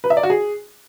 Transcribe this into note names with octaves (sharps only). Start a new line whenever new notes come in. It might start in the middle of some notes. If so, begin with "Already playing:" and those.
B4
E5
D5
F#4
G#4